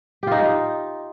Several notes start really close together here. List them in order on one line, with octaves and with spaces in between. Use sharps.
G4 F4 D#4